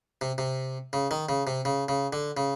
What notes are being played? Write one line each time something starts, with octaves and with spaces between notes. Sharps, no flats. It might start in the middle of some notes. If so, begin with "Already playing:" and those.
C3
C3
C#3
D#3
C#3
C3
C#3
C#3
D3
C#3